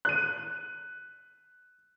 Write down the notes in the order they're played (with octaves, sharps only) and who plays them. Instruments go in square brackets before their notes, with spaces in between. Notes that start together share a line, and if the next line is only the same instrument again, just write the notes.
[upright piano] F#6 D#7